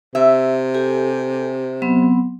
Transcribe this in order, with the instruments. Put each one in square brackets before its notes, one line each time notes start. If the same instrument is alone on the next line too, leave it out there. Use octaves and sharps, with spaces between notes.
[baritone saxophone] C3 [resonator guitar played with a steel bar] E5
[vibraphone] G4 A4 G#5
F#3 B3 C4